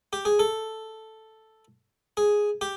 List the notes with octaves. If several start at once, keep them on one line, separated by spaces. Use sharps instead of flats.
G4
G#4
A4
G#4
G4